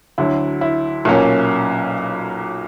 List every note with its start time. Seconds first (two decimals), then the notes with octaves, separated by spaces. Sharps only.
0.18 D2 D3 F#3 E4
0.61 E4
1.05 B1 A#2 A#3 C#4